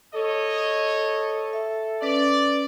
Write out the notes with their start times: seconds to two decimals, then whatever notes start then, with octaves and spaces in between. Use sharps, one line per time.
0.15 A4 C#5 D#5
1.53 E5
2.02 C#4 B4 D5